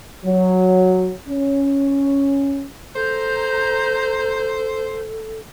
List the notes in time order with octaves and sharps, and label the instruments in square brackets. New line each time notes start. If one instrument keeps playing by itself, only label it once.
[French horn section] F#3
C#4
[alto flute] A4 [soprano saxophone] C5 [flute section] A#5 G6